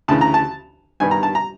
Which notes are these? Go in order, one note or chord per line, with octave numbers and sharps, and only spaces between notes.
D2 C#3 E3 A5
A#5
A5
G2 D#3 G3 B3 G#5
A#5
A5
A#5